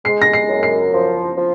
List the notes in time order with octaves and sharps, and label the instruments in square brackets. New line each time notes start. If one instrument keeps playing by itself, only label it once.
[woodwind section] G#3 [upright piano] C7
[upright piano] A#6
C7
[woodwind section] F#2
[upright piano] C7
[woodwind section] F3
F3